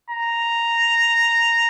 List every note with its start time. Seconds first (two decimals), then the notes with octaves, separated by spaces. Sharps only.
0.10 A#5